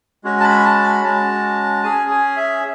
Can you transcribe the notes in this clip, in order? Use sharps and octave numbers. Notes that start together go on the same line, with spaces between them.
G#3 C#4 F#4
A5
B5
A5
B5
G#3 C#4 F#4 A5
C#4 G#4 G#5
G#5
E5